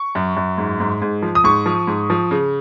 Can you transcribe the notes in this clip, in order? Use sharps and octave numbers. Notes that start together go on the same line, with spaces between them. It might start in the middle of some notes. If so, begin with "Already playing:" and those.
Already playing: C#6
F#2
F#2
G#2
G#2
G#2
F3
D#6
G#2 C#6
F3
G#2
F3
C#3